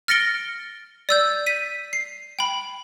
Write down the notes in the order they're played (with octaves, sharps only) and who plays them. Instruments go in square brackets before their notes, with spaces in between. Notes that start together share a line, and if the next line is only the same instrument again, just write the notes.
[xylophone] F6 A6 A#6 C#7 D7 G7
D5 E6 G6
B6 D#7
C7
G5 B5